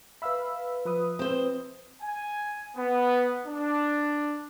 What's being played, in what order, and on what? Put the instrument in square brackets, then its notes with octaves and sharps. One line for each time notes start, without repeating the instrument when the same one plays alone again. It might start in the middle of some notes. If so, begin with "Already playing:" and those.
[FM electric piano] B4 F5 B5 [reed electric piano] E5 E6
[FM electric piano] F3 B4 D#6
[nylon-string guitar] C4 C5
[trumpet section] G#5
B3
D4